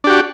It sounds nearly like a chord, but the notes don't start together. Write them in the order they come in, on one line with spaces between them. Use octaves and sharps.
D4 G4 F#4